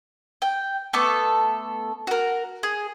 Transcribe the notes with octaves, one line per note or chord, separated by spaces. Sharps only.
G5
A3 B3 A4 D6
F#4 A#4
G#4